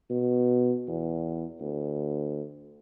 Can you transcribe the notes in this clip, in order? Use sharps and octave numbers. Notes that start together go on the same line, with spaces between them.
B2
E2
D2